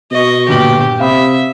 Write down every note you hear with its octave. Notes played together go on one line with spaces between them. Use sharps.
B2 D#5 C#6
G1 A#2 G4 F#7
C3 E5 F5 B5 D#6